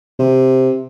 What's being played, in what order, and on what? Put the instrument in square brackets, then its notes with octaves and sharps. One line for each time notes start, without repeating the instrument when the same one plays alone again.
[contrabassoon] C3